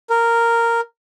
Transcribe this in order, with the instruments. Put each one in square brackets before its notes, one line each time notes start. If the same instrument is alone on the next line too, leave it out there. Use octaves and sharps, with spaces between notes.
[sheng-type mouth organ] A#4